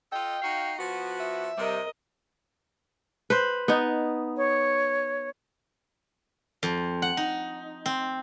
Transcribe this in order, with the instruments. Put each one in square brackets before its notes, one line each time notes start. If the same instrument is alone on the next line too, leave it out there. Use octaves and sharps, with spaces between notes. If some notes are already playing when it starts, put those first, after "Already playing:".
[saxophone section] F4 A4 D#5 [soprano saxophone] G5
[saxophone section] D#4 F#4 F5
F3 B3 F#4
[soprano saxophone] E5
[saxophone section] C3 G3 [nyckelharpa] A#4 D#5
[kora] B4 C5
B3 D#4
[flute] C#5
[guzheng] F2
F#5
D#4
C4